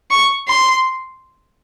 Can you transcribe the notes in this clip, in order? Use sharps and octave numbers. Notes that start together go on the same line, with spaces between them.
C#6
C6